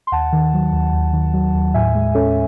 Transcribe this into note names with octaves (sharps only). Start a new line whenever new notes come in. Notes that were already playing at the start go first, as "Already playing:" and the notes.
C6
D#2 F#5 A5
D#3
F#3
D#2
D#2
D#3
F#3
D#2
A2 E5 G#5
G#3
C#4 A4 C#5